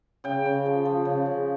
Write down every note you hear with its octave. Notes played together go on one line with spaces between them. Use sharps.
C#3 G5
C#3
F3
F3
C#3
C#3